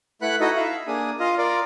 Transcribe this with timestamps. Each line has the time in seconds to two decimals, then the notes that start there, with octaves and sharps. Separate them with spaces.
0.22 A3 E4 B4 F#5 B5 F#6
0.41 D#4 E4 F#4 A4 D#5
0.56 E4 E5 F5
0.87 A#3 D4 G#4 D#6
1.20 F4 D#5 F5
1.38 F4 A#4 D5